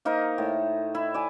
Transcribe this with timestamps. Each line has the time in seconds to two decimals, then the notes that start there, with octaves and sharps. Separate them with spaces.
0.05 A#3 D#4 A#4 C5
0.38 A2
0.95 E4
1.14 D5 G#5